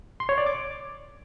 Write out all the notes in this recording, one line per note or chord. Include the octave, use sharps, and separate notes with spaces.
C6
C#5
D5
D6